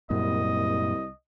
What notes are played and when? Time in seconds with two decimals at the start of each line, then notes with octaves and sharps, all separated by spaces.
0.10 C2 F#2 A#2 D#5